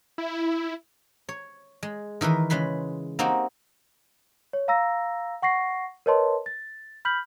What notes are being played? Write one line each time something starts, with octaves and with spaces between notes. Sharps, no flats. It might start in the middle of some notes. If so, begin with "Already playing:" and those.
E4
C#5
G#3
D#3 E3 A#4 B4
C#3 G#3 B4 B5 C6
A#3 C4 D#4 F#4 G4
C#5
F5 A#5 E6 A#6
F#5 C#6 A#6 C7
A#4 B4 C#5 D#5 A5 C6
A6
B5 F6 G6 B6 F#7